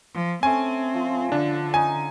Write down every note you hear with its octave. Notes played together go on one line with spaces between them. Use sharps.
F3
A3 C4 C#4 G#5
F3
D3 D4
C#4 D#4 G#5 A#5